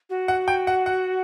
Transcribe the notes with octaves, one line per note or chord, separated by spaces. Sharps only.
F#4
F#5
G5
F#5
F#5